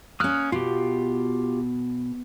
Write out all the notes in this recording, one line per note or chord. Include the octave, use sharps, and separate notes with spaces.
A#3 C#4 D#6 F6 F#6
B2 F4 G4